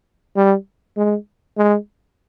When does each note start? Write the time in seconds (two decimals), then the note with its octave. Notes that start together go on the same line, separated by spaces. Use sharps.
0.36 G3
0.97 G#3
1.58 G#3